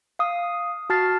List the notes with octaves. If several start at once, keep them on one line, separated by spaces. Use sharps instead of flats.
F5 D#6
F#4 A5 F6 A6 C7